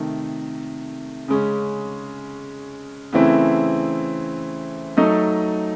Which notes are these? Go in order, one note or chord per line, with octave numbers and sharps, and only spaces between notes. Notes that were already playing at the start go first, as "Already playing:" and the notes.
Already playing: C3 D#3 A3
C#3 G#3 C#4
C#3 E3 A3 C4 E4
F#3 A3 D#4 A4 D#5